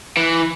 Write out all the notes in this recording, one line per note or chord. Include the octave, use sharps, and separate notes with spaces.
E3